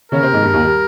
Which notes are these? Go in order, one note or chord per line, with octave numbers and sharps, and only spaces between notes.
C#3 C#4 A#4
C3 C4
G#2 G#3
G2 G3
D#2 D#3
G3